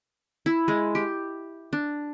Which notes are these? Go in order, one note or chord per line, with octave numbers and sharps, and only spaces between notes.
E4
G#3
G4
D4